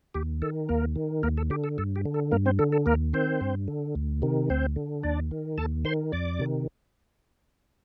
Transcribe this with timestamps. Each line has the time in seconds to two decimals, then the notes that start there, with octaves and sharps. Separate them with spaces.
0.14 D#2 G4
0.42 D#3 A4
0.69 D#2 A#3 A#4
0.96 D#3
1.23 D#2 A#3 A#4
1.38 A4
1.50 D3 G4
1.64 A4
1.78 G2 A4
1.96 G4
2.05 D3
2.14 A4
2.31 G2 A#3 A#4
2.46 C4 C5
2.59 D3 A4
2.72 A4
2.86 D#2 A#3 A#4
3.13 D#3 C4 C5
3.41 G2
3.68 D3
3.95 D2
4.22 C3 D#3
4.50 D2 C4 C5
4.76 D3
5.03 D#2 D4 D5
5.31 D#3
5.58 D#2 A4 A5
5.85 D#3 C5 C6
6.12 F2 D5 D6
6.39 C3 D#3